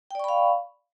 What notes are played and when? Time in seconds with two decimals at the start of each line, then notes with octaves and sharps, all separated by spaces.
0.11 G5
0.15 D5
0.20 C#6
0.24 B5
0.29 F5